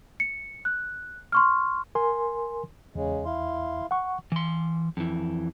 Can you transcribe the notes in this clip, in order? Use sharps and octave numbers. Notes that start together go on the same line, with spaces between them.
C#7
F#6
C6 C#6 F6
A#4 G#5 C6
E2 C#3 G#3
E4 F5 C6
F#5 C#6
E3 C6
F2 E3